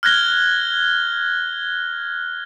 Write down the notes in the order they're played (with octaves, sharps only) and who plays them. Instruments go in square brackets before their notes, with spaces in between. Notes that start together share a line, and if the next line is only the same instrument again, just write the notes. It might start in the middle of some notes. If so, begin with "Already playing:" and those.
[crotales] F6 F#6 G#6 A#6 G7